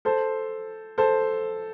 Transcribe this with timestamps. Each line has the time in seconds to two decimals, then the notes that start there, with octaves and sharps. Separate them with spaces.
0.05 A4 C5
0.98 A4 C5